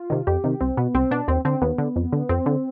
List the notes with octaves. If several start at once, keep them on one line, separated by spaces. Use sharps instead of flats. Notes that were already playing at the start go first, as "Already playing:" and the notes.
Already playing: F4
C3 D#3
F2 G4
C3 D#3
C2 C4
B2 B3
C2 C4
B2 D4
D#2 C4
D3 C4
D#2 B3
D3
F2
D3
F2 C4
D3